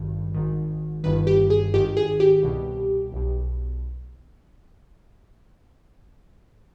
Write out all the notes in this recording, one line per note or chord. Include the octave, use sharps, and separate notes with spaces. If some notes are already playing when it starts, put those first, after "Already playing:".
Already playing: G#1 G2 D#3
G#1 G#2 D#3
G1 G2 D#3 B4
G4
G#4
G#1 G#2 D#3 G4
G#4
G4
C2 B2
B1 B2